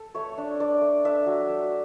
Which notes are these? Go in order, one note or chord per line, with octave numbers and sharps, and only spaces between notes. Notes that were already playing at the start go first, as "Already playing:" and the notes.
Already playing: A4
A3 C#5
D4
D4 D5
A3
D4 E5
F#3
A3